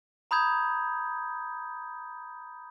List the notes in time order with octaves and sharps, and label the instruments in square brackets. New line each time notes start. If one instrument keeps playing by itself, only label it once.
[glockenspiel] A#5 B5 D#6 G6 G#6